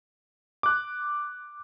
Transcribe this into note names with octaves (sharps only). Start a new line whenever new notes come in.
D6 F#6